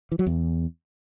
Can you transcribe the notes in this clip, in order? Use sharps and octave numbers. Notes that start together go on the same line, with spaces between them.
E3
F#3
E2